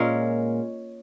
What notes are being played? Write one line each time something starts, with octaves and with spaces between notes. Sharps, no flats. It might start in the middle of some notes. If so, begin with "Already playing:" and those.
Already playing: A#2 G#3 C#4 A#4 C#5